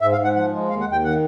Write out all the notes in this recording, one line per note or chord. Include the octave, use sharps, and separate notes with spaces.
G#2 E5
F5
G#2
F#5
F3 F#5
G#3
D#2 F5
F#5
D#2
G5
D#3 F#5